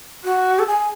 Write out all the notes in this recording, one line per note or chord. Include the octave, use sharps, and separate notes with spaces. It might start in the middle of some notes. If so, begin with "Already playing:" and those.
F#4
A4
G#4